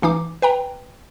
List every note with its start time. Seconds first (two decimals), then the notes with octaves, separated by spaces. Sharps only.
0.02 A1 E3 D#4 D6
0.42 B4 G5 A#5